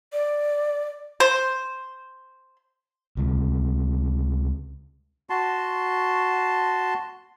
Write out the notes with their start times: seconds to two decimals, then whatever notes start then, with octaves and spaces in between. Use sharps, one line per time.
0.13 D5
1.20 C5
3.17 C#2 C3
5.30 F#4 A5 C6